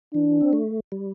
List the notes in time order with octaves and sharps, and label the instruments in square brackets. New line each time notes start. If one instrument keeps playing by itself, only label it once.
[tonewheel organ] E3 [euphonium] D4
[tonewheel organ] C4
A3
G3